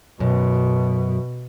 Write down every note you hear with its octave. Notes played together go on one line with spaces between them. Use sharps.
F#2 B2